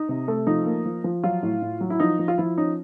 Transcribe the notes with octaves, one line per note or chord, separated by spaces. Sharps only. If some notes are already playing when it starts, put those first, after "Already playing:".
Already playing: D#4
C3
A3
F3 D#4
A#3
F3
F3
F#3 F4
A2
A2
F#3
E4
F3 D#4
F3
F4
F3 E4
C#4 D#4